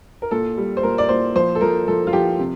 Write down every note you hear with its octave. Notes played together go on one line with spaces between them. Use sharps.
A#4
A#2 A4
G3
C5
A#2 A#4
D5
A#2 C5
F3 C5
A4
F3 A#4
F3 A4
F4
F3 G4
C3